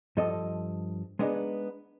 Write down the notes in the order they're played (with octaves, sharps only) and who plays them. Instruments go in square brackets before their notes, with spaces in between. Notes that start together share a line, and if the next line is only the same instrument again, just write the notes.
[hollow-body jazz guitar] G2 F3 A4 D#5
G#3 B3 D4 D#4